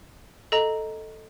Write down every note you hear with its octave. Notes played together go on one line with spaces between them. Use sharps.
A4 D#5 A#5